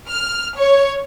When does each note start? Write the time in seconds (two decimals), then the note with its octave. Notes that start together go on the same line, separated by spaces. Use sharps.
0.10 F6
0.58 C#5